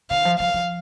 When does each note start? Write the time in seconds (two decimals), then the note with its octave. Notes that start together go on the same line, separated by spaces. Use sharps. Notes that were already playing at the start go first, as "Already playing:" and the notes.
0.10 D#3 F5
0.25 F3
0.39 F3 F5
0.54 F3